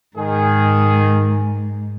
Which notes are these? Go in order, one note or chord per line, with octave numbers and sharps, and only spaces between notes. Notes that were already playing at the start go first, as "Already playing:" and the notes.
G#2 D#3 G#4